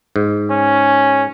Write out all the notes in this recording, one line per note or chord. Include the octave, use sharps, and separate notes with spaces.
G#2
C#4